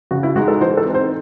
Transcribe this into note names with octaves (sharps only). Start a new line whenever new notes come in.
C#3 F#4
E4
G#3 D#4 F#4
A4
E3 C5
A4
C4 D#4
C5